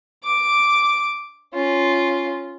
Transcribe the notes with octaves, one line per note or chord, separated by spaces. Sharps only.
D6
C#4 F4